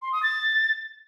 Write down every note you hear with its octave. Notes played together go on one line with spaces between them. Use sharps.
C6
D#6
A6